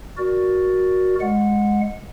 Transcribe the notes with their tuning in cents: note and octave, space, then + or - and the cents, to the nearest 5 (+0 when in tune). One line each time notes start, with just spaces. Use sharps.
F#4 +0 A#4 +10 D5 +0
G#3 +0 F#5 -20